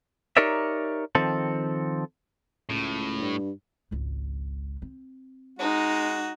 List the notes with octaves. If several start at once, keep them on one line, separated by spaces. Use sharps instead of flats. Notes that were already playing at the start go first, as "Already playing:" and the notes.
D#4 G4 A#4 C#5 D5 E5
D#3 F3 C4 A4
C#2 A2
G2
G#1 C#2
C4
G#3 D#4 F#4